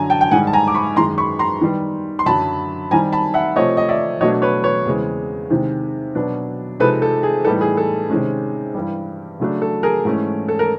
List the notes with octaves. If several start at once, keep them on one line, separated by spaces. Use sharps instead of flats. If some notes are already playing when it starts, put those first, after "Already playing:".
Already playing: F#2 D3 F#3 G#5 A#5
G5 A5
G5
G#2 D#3 G3 F#5 G#5
A5
G#5 A#5
D6
B5 C#6
F#2 D#3 G#3 A#5 C6
B5 C#6
A#5 C6
D#3 G3 B3
C6
F#2 D3 F#3 A5 B5
D#3 G3 C4 G#5 A#5
A5 B5
E5 F#5
C3 F3 A3 C4 C#5 D#5
D#5
D5 E5
B2 F#3 A3 D4 C#5 D#5
B4 C#5
B4 C#5
E2 C#3 E3 G#3 C4
C3 D#3 G#3 C4
B2 F#3 B3 D4
C3 F3 G#3 C4 D#4 A4 B4
A4
G#4
A2 E3 G3 B3 D#4 A4
G#4
A4
C3 D#3 G#3 C#4
G2 E3 G3
C#3 F#3 A3 D4
A4
G#4 A#4
G#2 E3 A3 C#4
A4
A#4